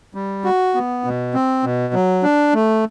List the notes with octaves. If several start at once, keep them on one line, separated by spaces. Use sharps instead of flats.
G3
F#4
B3
B2
C4
B2
F#3
D4
A3